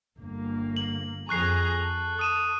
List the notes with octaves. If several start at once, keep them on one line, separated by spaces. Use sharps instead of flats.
G1 A#3
F#7
F2 G#4 A#5 C#6 F#6 C7
A4
D#6 D#7 E7